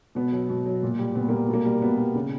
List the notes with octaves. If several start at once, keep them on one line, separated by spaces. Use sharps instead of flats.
B2 B3
F#3
B2
F#3
A#2
G3
A#2 B3
G3 A#3
B2
A#3
G3
B2 B3
G3
C#3